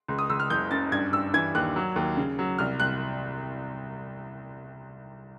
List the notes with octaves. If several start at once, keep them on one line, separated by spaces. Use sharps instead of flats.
C#2
D#6
C#2 E6
F6
F#1 G6
F#2 A6
G2 G#6
G2 E6
E3 G#6
D#2 F#6
F#3
D#2
C#3
F#3
C2 F6
C2 F#6